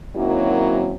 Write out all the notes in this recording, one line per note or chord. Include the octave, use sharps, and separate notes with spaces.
F#2 D#3 F#3 A#3 C4 E4